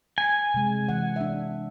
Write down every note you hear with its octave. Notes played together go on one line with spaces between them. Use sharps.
G#5
C3 G#3
E3 F#5
D4 E5